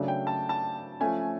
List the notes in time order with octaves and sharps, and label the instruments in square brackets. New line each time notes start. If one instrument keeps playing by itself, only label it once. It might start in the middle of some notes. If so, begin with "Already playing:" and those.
Already playing: [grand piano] C#3 F#3 A3 D4
G5
A5
A5
F3 A3 C#4 G#5